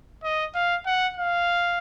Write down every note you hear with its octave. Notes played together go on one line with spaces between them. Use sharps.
D#5
F5
F#5
F5